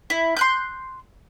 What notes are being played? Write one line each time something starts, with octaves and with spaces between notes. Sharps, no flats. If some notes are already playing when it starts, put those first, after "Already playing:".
E4
C6 F#6 G6